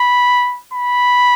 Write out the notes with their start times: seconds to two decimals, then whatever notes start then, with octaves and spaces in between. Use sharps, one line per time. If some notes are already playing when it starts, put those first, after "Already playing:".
Already playing: B5
0.74 B5